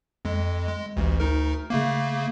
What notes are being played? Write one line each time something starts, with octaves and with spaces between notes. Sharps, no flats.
F2 G#3
G#3
A1 D2
D2 D#4 A#4
C#3 A3 A#3